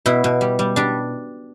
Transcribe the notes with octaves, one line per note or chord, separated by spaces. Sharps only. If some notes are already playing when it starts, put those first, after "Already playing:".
B2 E4
B2
G3
G3
G3 D4